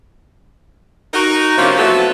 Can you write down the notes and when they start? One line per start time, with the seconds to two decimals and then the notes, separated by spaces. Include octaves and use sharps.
1.14 D#4 F#4 A#4
1.57 C3 F3 A#3 C#4 D4 E4
1.78 F#3 A3 B3 C4 F#4 A4